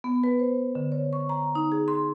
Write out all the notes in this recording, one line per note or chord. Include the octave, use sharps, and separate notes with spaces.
B3
B4
C5
D3
C#5
C#6
A#5
D#4
G#4
C6